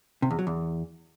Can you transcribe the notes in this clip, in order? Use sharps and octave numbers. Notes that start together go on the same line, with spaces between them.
C3
E2
F#3
E2